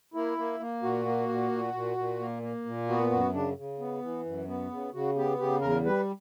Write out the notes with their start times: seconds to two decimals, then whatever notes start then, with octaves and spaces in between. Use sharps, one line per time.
0.14 A#3 E4
0.38 A#3
0.60 A#3
0.83 A#2 F#4
1.05 A#3
1.29 A#2
1.51 A#2
1.74 A#2
1.97 A#2
2.20 A#3
2.43 A#3
2.65 A#2
2.89 B3 F#4
3.11 F#2 F#4
3.33 C#3 D4
3.57 C#3
3.79 B3
4.02 E3
4.26 F#2
4.48 B3
4.71 C#3
4.93 C#3 F#4
5.16 B3 G4
5.39 C#3 G4
5.61 E2 A#4
5.85 G3 B4